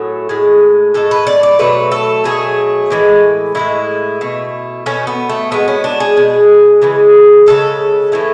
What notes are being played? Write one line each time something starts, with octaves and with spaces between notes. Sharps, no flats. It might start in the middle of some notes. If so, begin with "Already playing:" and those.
Already playing: A2 F#3 A3 G#4
A2 G#3
A2 G#3 A4
B4
D5
D5
B2 F#3 A3 B4
A4
B2 F#3 A3 G#4
A2 E3 G#3
A2 E3 G#3 E4
B2 A3
B2 A3 C#4
B3
A3
B2 G#3 B3
C#4
D4
G#4
B2 G#3
C#3 E3 G#3
C#3 E3 G#3 A4
A2 E3 A3